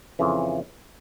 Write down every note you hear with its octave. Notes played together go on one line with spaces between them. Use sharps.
F2 C#3 E3